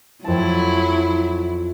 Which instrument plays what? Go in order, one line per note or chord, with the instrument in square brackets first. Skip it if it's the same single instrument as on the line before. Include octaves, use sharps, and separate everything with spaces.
[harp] F2 A5 [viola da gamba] F#3 E4